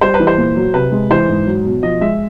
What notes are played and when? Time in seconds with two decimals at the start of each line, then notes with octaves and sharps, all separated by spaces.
0.01 G3 C5
0.14 B4
0.19 E3
0.27 C5
0.37 A#2
0.56 F#3
0.74 C3 B4
0.92 G#3
1.10 E3 C5
1.28 G#2
1.46 F#3
1.65 B2
1.83 F3 D#5
2.01 G#3 E5